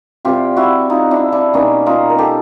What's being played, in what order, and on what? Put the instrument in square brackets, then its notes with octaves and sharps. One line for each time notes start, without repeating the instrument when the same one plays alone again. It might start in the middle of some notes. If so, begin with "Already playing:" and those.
[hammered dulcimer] C3 E3 G3 F4 G4
E4 F#4
D#4 F4
D4 E4
D4 E4
B2 G3 A#3 C#4 D#4
D#4 F4
A#4
G4 A4